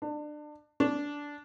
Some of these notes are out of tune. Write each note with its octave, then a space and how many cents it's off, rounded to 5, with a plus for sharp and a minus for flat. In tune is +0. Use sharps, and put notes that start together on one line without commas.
D4 +25
D4 -15